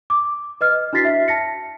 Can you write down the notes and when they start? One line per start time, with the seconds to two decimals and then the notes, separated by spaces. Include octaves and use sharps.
0.10 D6
0.61 B4 D#5 F6
0.93 D4 E4 F#4 A6 B6 C7
1.05 E5
1.28 A5 A#6 C#7